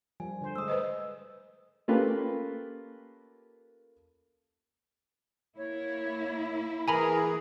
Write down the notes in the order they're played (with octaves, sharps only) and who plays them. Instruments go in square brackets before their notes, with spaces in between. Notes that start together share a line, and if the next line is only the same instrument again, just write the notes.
[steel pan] F3 G3 [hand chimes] G#5
[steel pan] D3 C5
[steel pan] G#3 A3 [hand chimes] D#6 E6
[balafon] B4 C5 D#5
[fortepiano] A3 A#3 C#4 F4 G4 B4
[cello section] A#3 E4 [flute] C#5
[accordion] E3 G#4 [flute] A#4 [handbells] G#5 A#5 B5